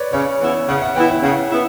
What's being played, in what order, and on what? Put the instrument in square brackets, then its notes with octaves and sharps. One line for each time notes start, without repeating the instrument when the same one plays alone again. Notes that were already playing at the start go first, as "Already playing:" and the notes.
Already playing: [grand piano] B4 C#5 D5
[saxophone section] C#3 [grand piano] C#5
[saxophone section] E3 B3 E4
[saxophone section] C#3 [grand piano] F#5
[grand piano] E5
F#5
[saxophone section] E3 B3 E4 [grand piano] G5
[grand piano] E5
[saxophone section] C#3 [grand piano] F#5
[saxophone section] B3 E4